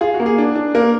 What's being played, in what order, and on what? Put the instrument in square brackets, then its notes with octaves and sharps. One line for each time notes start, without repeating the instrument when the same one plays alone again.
[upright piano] F4 [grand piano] G#4
[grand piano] F#4
[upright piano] A#3
[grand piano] G#4
[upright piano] D4
D4
[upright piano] A#3 [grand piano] A#4